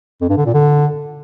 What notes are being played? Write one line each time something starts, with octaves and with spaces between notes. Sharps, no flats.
F2
G2
D3
A#2
D3